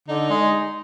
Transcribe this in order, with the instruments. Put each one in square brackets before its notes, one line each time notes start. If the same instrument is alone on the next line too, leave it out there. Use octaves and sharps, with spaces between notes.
[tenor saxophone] D3 [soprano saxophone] D#4
[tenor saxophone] G#3